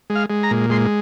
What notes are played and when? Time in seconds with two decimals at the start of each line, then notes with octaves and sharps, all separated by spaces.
0.10 G#3
0.15 F5
0.30 G#3
0.43 A#5
0.51 A#2
0.70 G#3 C6